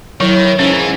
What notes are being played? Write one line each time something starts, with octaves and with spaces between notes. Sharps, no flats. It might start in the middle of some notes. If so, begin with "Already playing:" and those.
D#3 F#3 E4 C#5
G#2 C#3 E3 C#4